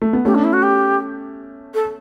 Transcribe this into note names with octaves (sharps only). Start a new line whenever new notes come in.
A3
B3
A3 C#4 G4
D4
E4
F#4
G4
A4